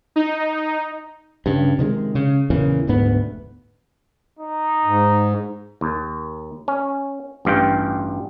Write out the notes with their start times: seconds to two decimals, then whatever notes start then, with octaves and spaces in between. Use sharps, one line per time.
0.16 D#4
1.46 G2 C#3
1.79 C3 D#3 F#3 G#3
2.15 C#3
2.50 E2 A#2 C#3 E3
2.87 F1 D2 G#2 B3
4.39 D#4
4.85 G#2
5.81 D#2
6.68 C#4
7.45 A1 G2 F4 G5